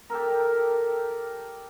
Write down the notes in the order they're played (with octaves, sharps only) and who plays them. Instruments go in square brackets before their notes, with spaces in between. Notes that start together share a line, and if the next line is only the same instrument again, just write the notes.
[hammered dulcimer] G4 A4 A#4